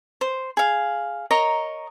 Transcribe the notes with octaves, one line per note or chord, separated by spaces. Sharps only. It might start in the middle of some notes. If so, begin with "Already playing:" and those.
C5
G#4 F5
A#4 C#5 D#5 A#5